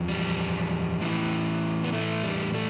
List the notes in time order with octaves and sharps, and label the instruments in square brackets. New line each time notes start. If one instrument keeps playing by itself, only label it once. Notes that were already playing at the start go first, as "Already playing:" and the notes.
Already playing: [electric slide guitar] E2 F3
G3
A2 E3
B3
A3
G3
A3